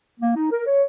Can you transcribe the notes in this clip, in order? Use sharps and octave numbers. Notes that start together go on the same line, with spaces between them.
A#3
D#4
A#4
C#5